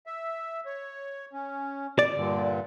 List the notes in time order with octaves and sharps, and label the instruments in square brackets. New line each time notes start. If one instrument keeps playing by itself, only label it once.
[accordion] E5
C#5
C#4
[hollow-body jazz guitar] D5
[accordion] G2 A#2 D3